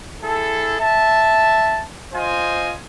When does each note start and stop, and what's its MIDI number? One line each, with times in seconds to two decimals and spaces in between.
0.23 0.76 64
0.23 0.76 68
0.23 0.76 69
0.80 1.83 76
0.80 1.83 81
2.13 2.73 65
2.13 2.73 72
2.13 2.73 75
2.13 2.73 80